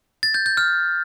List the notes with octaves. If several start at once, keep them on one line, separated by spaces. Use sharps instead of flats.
A6
G6
G6
F6